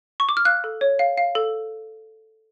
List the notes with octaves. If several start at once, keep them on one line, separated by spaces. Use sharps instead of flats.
C#6
D6
F6
F5 F#6
A4
C#5
F5
F5
A4